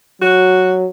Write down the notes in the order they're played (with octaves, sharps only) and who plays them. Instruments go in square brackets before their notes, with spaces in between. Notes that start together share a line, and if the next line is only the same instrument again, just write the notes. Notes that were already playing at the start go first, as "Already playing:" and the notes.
[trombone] F#3 [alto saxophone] F#4